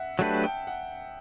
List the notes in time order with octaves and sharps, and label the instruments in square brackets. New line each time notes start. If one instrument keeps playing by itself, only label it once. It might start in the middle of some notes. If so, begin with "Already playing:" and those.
Already playing: [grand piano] E5 F#5
[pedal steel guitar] F#3 A3 D4 G4 B4 [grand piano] A5
[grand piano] A5
G5
F#5